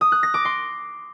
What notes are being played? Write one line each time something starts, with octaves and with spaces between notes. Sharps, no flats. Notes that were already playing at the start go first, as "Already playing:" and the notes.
D#6
F#6
A#6
D6
C6